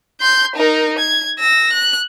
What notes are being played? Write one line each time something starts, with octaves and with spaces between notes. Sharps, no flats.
C6 G6
D#4 A#4
G#6
E6 A#6
F#6